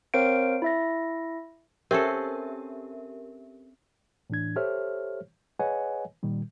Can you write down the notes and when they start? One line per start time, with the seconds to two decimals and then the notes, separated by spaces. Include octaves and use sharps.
0.14 C4 A#4 C5 C#5 F5 D7
0.62 E4 E5 A#6
1.91 C4 C#4 G4 A4 A#4 E5
4.30 A2 E3 D4 G#6
4.56 G4 A4 C5 C#5 E5 F6
5.59 G#4 B4 C#5 D#5 F#5 G#5
6.23 A#2 D#3 G3